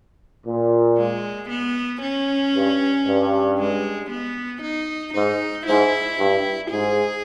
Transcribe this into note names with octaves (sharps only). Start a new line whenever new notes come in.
A#2
G#3
B3
C#4
G2
G2
G#3
B3
D#4
G#2 D#4
G#2 E4
G2
G#2 G#4